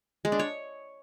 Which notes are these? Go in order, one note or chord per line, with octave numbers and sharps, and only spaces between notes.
G#3
D4
C#5